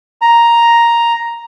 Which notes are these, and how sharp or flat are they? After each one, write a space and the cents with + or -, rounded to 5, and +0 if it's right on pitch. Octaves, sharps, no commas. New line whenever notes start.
A#5 +5